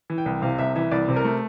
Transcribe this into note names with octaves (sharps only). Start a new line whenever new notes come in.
E3
G5
C2
C3 F5
C2 E5
E3 E5
C2 D5
C3
A#4
A3